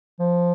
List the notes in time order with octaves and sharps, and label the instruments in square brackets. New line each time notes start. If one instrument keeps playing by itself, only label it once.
[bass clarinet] F3